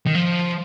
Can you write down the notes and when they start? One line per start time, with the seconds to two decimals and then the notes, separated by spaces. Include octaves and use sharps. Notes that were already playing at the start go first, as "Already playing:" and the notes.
0.06 D#3
0.15 F3